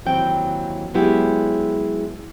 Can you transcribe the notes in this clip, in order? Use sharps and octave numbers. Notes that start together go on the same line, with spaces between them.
D#2 E3 F#3 C4 G5
F#3 G#3 B3 E4 G4